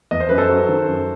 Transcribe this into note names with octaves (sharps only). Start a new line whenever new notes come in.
E2 D#5
C5
F#2 B4
A4 C5
F#3
D#3
F#2